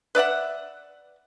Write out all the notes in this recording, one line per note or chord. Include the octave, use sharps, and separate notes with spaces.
B4 D5 E5 F#5